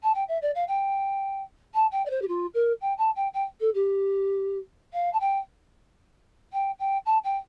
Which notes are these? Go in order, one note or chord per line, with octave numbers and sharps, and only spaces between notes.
A5
G5
E5
D5
F5
G5
A5
G5
D5
C5
G4
F4
A#4
G5
A5
G5
G5
A4
G4
F5
A5
G5
G5
G5
A5
G5